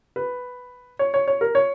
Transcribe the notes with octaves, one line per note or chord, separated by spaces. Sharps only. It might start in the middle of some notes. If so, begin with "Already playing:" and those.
B4
C#5
C#5
C#5
A#4
C#5